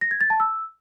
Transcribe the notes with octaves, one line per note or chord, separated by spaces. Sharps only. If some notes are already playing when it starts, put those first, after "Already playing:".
A#6
G#6
A6
A5
E6